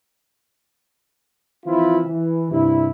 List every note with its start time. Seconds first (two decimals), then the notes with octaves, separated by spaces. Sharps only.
1.66 E3 F3 C4 E4 F4
2.05 E3
2.51 G2 C3 E4